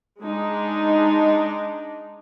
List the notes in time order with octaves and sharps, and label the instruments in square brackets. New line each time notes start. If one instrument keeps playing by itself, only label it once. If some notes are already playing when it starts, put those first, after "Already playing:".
[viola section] G#3 D4 D#4